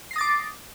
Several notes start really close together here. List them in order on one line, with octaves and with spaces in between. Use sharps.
C7 A#6 D#6 A6 D6